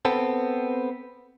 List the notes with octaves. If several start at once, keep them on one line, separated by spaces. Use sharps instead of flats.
B3 C4 A4